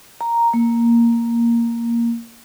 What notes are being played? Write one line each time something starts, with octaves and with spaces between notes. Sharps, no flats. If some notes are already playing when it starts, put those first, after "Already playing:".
A#5
A#3